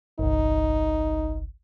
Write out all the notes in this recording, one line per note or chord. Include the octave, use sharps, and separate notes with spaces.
G1 C2 D#4